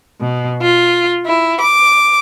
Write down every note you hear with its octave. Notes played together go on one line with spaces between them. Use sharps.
B2
F4
E4
D6